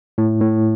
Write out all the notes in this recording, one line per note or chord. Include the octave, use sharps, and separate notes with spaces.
A2
A2